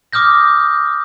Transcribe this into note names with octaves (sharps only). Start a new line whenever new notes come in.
D6 D#6 F6 G6 A#6